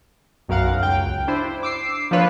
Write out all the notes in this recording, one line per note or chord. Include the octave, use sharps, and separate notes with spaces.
B1 F#2 A#4 F5 F#5
C#2 G5
D4 E4 C5
D6 E6 C7
F3 A#3 D4 F4 B4 C#5